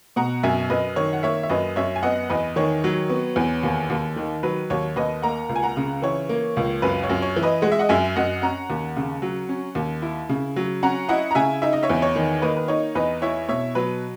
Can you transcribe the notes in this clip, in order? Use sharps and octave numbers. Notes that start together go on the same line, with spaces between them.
B2 F#5 A#5
F#2 E5 G#5
F#2 B4 D#5
D#3 C#5
F#5
A#3 C#5 E5
E5
F#2 B4 D#5
F#2 C#5 E5
G#5
B3 D#5 F#5
E2 B4 D#5
D#3 C#5
F#3
B3
E2
D#2
D#2
D#3
F#3 B4
D#2 C#5
D#2 B4 D#5
A#3 F#5 A#5
C#2
G#5
F#5 A#5
C#3
E3 C#5
A#3
C#2
F#2 B4
C#5
F#2
C#5
E3
B4 D#5
G#3 F#5
E5
D#5 F#5
F#2 E5 G#5
F#2 D#5 F#5
C#4 F#5 A#5
D#2
C#3
F#3
C#4
D#2
E4
C#3
F#3
C#4 F#5 A#5
E4 D#5 F#5
A#5
C#3 E5 G#5
D#4 E5
D#5
C#5 E5
E2
C#5
D#3
A#3 B4 D#5
B4
D#4 C#5
E2 B4 D#5
E4 C#5 E5
B2 C#5 E5
F#3 B4